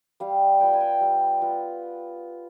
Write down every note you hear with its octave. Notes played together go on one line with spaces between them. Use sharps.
G3 F5
B3 F4 G5
G#5
G5
G3
B3 F4